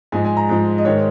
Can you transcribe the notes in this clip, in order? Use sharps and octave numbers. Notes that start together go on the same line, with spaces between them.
G#2 F3 G#3 G#5
G#5
A#5
G#2 F3 G#3
D#5
G#2 D#3 G#3 C#5